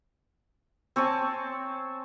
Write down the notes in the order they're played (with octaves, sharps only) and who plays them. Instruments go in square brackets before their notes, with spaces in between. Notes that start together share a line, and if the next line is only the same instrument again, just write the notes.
[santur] C4 C#5 G#5 A5